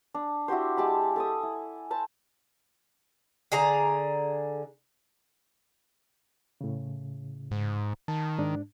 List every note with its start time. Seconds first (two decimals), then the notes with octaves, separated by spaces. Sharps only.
0.14 D4
0.48 E4 F#4 G4 C5
0.77 G#3 G4 A5 B5
1.16 A4 G#5 D#6
1.43 E4
1.91 C5 A5 B5
3.52 D3 G#4 A#5
6.61 A2 C#3
7.51 G#2
8.08 D#3 A5
8.38 G#2 D4